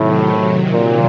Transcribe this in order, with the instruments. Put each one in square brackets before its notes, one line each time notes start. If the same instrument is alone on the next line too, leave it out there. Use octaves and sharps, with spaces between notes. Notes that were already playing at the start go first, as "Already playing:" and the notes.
Already playing: [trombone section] A2 [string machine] C3 D#3 F#3
[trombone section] A#2